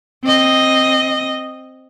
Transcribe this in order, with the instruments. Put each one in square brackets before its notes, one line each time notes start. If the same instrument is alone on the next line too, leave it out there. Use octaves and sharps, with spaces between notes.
[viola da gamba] C4 D#5